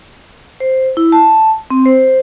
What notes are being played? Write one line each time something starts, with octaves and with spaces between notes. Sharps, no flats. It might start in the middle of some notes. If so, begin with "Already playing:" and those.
C5
E4
A5
C4
C5